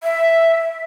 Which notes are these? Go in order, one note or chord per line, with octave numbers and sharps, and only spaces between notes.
E5